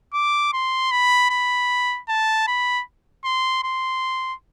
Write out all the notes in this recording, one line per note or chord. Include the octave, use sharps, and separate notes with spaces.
D6
C6
B5
B5
A5
B5
C6
C6